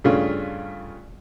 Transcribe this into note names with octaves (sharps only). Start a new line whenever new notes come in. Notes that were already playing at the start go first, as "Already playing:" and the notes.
G2 C#3 A3 F4